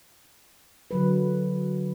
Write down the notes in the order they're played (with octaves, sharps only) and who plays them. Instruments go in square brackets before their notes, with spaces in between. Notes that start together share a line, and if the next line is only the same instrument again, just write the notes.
[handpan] D3 F#3 B4